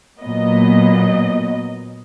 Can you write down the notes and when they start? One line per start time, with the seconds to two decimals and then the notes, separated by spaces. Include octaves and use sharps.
0.21 A#2 F#3 B3 D#5